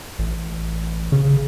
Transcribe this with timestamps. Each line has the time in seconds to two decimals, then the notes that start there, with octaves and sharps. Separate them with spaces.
0.19 A1
1.12 C#3